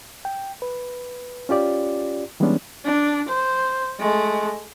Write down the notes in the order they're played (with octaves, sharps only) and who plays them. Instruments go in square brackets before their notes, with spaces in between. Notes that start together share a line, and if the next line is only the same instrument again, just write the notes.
[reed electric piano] G5
B4
C#4 F4 G4 D5
E3 G3 G#3 B3 C#4 D4
[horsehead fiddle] D4
C5
G#3 A3